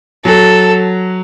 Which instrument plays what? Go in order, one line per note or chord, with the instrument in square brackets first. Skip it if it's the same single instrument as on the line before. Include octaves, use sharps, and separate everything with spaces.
[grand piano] F#3 [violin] A4